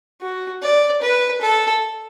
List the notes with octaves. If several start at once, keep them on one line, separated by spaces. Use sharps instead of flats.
F#4
D5
B4
A4